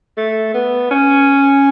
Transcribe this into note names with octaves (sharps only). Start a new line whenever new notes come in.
A3
B3
C#4